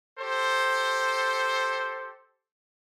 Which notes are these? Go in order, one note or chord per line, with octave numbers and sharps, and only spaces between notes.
G4 A4 C5